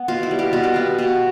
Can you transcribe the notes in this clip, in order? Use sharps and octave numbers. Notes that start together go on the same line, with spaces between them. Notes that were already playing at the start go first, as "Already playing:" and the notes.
Already playing: B3
B2 F4
E4
G3
G4
B2 F4
G4
B3 F4
B2